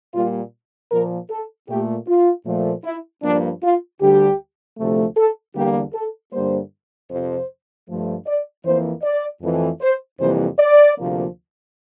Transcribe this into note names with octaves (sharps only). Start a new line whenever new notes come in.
A#2 G3 A#3 F4
A#2 F3 A#3 A#4
A4
A#2 A3 G4
F4
A#2 F3 A3
E4
G2 F3 A#3 D4
F4
D2 D3 G3 G4
D2 C3 F3 A3
A4
E2 D3 G3 A#3 G4
A4
G2 D3 G3 A#3 C5
F2 C3 F3 C5
G2 F3 A3
D5
F2 E3 A#3 C5
D5
F2 E3 A3
C5
F2 C3 E3 G3 A#3 C5
D5
D2 C3 F3 A#3